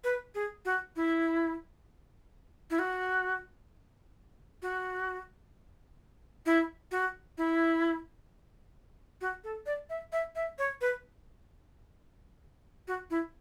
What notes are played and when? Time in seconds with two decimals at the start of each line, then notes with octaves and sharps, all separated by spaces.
0.04 B4
0.35 G#4
0.65 F#4
0.96 E4
2.70 E4
2.79 F#4
4.62 F#4
6.46 E4
6.91 F#4
7.38 E4
9.21 F#4
9.44 A4
9.66 D5
9.90 E5
10.12 E5
10.35 E5
10.59 C#5
10.81 B4
12.88 F#4
13.10 E4